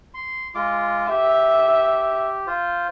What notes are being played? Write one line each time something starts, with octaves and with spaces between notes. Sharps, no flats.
C6
G#3 F4 D6
G4 E5
F4 C5